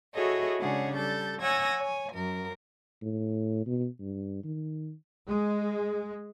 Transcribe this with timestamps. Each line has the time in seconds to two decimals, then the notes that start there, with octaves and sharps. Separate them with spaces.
0.13 E4 F#4 G#4 A4 C#5 D#5
0.59 C#3 G#3 D4 G#4 C#5 F#5
0.95 G3 A4 G6 A6
1.41 C#5 F#5 G#5 E6 G#6 A#6
1.79 C#5 G#5
2.12 F#2 A#4
3.02 A2
3.66 B2
4.00 G2
4.44 D#3
5.27 G#3